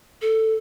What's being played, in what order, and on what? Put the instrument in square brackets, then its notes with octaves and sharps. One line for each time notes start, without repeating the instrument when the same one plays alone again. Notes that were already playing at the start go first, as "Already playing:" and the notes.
[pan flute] A4